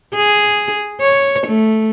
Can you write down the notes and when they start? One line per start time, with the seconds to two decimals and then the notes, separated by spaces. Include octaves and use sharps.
0.15 G#4
1.01 C#5
1.47 A3